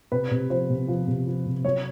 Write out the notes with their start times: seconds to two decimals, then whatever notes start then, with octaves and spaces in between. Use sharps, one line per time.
0.12 C3 B4
0.31 C3
0.50 F3 C5
0.70 C3
0.88 F3
1.08 C3
1.27 F3
1.46 C3
1.65 F#3 C#5